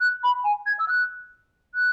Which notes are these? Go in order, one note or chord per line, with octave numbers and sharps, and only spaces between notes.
F#6
B5
G#5
G#6
E6
F#6
F#6